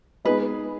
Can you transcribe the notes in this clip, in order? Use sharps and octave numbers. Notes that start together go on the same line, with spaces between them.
G#3 B3 D#4 G#4 B4 D#5